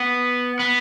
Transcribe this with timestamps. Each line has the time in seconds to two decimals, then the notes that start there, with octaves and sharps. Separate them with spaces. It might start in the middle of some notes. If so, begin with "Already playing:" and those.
Already playing: B3
0.59 B3